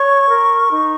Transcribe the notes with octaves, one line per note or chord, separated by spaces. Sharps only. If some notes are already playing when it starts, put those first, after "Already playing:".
Already playing: C#5 C#6
A#4
D#4